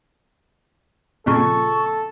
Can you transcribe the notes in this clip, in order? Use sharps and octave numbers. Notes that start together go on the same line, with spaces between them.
F2 A#2 C#3 A4 C#6